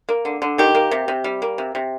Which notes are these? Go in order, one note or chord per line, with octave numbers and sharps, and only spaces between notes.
A#3
D3
D3
D#3 G4
A#3
C3
C3
G3
A#3
C3
C3